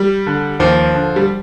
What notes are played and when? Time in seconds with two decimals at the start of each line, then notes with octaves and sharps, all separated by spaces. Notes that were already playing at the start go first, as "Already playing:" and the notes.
Already playing: G3
0.26 D3
0.60 D#2 F3
0.94 D3
1.16 G3